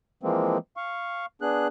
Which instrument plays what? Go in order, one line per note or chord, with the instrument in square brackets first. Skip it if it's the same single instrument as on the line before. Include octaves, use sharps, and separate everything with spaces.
[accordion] E3 F3 G#3 A#3 C4
F5 C#6
B3 D4 G#4 F#6